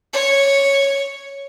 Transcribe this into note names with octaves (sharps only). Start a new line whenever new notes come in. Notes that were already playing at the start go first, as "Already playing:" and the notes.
C#5